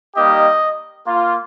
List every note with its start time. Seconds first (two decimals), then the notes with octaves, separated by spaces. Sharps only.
0.15 G3 A#3 D#4 G4 D#5
1.05 A#3 F4